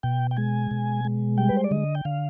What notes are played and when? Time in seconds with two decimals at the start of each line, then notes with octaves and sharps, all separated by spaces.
0.03 B2 G5
0.31 G5
0.37 G#3 G#5
0.71 B2
1.05 G#3
1.38 G3 G5
1.49 B4
1.57 C5
1.64 D5
1.71 D3 D#5
1.95 G5
2.05 D3 F5